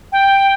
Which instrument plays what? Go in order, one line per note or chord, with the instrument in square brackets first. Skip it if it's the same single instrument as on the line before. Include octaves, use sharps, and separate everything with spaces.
[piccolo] G5